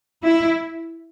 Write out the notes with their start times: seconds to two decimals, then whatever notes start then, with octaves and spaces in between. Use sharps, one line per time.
0.24 E4